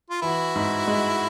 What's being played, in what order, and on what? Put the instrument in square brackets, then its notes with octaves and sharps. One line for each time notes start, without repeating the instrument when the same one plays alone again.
[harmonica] F4
[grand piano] E3 [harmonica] E4 F#4
[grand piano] G#2
G#3